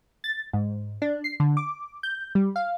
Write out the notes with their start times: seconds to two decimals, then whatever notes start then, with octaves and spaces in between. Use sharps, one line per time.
0.24 A6
0.53 G#2
1.02 D4
1.24 C7
1.40 D3
1.57 D6
2.03 G6
2.35 G3
2.56 F5